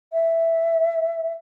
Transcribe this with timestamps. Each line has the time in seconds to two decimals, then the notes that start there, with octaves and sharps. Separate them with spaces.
0.13 E5